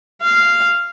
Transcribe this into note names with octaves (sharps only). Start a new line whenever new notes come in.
F5